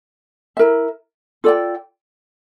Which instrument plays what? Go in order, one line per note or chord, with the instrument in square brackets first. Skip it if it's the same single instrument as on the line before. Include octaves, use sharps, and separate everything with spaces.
[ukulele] E4 A#4 E5
F4 A4 D5 G5